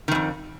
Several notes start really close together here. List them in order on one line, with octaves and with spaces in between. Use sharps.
D#3 G#2 F2